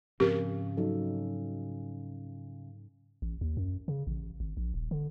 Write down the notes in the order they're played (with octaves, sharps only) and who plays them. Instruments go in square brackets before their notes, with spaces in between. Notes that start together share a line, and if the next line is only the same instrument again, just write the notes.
[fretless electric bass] G#2 F3 C4 [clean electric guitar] C#3 [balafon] G4 A#4
[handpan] F#3 D#4 A4
[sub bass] A1
D#2
F#2
C#3
A1
G#1
A#1
D#1
D3